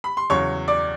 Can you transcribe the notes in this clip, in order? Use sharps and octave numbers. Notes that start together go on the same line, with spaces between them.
B5
C6
E2 C#3 F#3 C#5 C#6
D5 D6